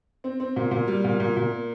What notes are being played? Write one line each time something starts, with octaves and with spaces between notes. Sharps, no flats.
C4
C4
A#2
A#2
G3
A#2
A#2
A#2
A#3